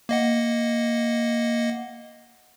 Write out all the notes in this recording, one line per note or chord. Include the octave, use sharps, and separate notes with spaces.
A#3 D#5 F#5